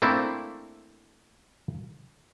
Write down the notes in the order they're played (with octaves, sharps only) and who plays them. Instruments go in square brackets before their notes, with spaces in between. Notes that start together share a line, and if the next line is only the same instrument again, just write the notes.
[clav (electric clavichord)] A3 A#3 C4 D4 E4